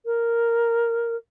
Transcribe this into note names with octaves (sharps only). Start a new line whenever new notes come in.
A#4